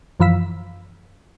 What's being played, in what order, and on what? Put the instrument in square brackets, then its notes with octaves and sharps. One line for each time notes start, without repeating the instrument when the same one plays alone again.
[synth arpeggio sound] F#2 E3 F3 F5 E6 B6